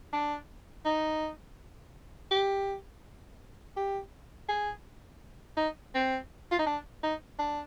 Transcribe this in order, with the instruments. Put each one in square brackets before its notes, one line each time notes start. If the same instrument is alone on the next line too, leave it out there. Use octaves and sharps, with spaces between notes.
[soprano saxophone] D4
D#4
G4
G4
G#4
D#4
C4
F4
D#4
D4
D#4
D4